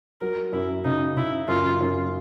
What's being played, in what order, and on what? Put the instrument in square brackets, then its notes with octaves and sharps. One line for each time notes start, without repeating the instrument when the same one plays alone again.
[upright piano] F#3 [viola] A#4
[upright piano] F#2 [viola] E4
[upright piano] C#3 [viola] D#4
[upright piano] C#3 [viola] E4
[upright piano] F#2 [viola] F4
[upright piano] F#2